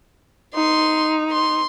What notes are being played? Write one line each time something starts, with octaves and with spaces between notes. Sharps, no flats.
D#4 C6
C6